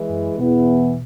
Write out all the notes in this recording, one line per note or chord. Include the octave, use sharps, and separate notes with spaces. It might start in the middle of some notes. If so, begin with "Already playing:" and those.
Already playing: E3 G#3 E4 G#4
F#2
E2 B2 E3 B3